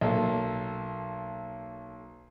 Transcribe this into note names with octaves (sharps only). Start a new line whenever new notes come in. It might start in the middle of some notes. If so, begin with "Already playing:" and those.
B1 A#3 A4